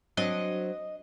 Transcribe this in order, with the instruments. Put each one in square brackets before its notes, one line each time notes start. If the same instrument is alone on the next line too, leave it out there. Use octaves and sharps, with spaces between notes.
[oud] F#3 C4 D4 [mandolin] D#5